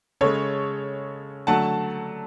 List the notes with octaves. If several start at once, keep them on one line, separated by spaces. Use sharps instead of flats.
C#3 G#3 A4 C#5
D3 F#3 A3 F#5 A5